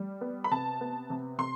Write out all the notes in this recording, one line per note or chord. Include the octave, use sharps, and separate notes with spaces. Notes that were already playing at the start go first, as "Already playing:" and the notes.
Already playing: G3
B3
B5
C3 A5
B3
C3
C3 C6